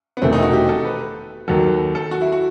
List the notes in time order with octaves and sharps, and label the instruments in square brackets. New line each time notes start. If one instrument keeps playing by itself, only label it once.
[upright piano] B3
[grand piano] E1 E2 C3 D#3 A3 [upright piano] C4
[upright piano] D#4
F#4
G4
A4
B4
[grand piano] D#2 D#3 F#3 [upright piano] A4
[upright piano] A4
F#4
E4
F#4